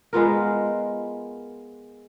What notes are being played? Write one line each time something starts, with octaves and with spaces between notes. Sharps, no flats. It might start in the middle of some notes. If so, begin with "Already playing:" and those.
G#3 B3 F4 A#4